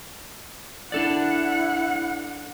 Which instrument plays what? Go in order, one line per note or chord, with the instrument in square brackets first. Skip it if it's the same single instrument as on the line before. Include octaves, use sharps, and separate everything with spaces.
[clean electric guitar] D4 A4 D5 [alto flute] E4 [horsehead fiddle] F#5